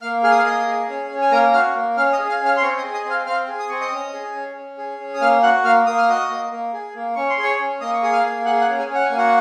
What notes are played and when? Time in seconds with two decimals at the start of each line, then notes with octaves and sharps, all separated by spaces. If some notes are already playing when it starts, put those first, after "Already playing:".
0.02 A#3 F5 F6
0.23 G#4 F6
0.32 D#6
0.38 F5 F6
0.45 A#3 D#5 D#6
0.67 G#4
0.89 C#4
1.10 C#4
1.21 G#5
1.32 A#3 A#4 A#5
1.53 F#4 F5 F6
1.75 A#3
1.96 C#4 F5 F6
2.13 D#5 D#6
2.19 G#4
2.29 F5 F6
2.40 C#4
2.45 F5 F6
2.57 C6
2.62 C4 C#5 C#6
2.78 D#5 D#6
2.84 G#4
2.94 D#5 D#6
3.05 C4
3.10 F5 F6
3.26 C4 F5 F6
3.48 G#4
3.59 D#6
3.69 C4 C#6
3.81 D#5 D#6
3.92 C#4
4.13 G#4
4.35 C#4
4.57 C#4
4.78 G#4
5.00 C#4
5.14 D#6
5.21 A#3 F5 F6
5.43 F#4 F#5 F#6
5.64 A#3 F5 F6
5.87 A#3 D#6
5.98 F6
6.08 F#4 D#5 D#6
6.29 A#3
6.51 A#3
6.73 G#4
6.94 A#3
7.16 C#4 C#6
7.30 C6
7.38 G#4
7.43 C#5 C#6
7.60 C#4
7.81 A#3 D#5 D#6
7.94 C#6
8.03 G#4 D#6
8.13 F5 F6
8.24 A#3
8.45 G#4 F#5 F#6
8.61 F#5 F#6
8.68 C#4
8.78 G#4 G#5
8.89 C#4
8.95 F#5
9.05 G#5
9.10 A#3
9.17 F#4 F#5